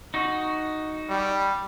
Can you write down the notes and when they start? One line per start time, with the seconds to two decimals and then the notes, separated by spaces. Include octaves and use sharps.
0.14 D#4 F#4
1.10 G3